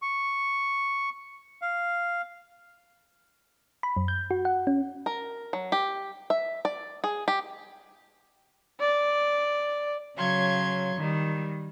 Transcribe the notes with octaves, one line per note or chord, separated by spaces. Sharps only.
C#6
F5
B5
F#2
G6
F#4
F#5
C#4
A#4
F#3
G4
E5
D5
G#4
G4
D5
C#3 F#3 F5 C6 C#6 G#6
D#3 G3